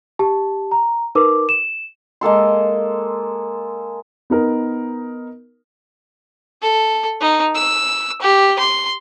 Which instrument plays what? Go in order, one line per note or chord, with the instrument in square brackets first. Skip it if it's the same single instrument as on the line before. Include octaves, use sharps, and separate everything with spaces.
[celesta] G4 A5
A#5
D#4 A#4 B4 D6
E7
[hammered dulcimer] G#3 A#3 A4 C6
[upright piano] B3 D#4 A#4
[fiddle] A4
D#4
E6
G4
C6